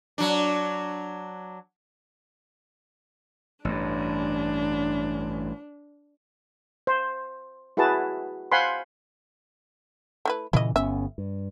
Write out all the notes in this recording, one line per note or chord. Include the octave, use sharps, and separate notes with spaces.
F#3 D4
A1 G2 D4
C5
E4 F#4 G#4 B4 A5
C5 F5 F#5 G#5 B5 C6
A3 E4 B4
A#2 C#3 E3 E4 D#5
G1 B3 C#4 E5
G2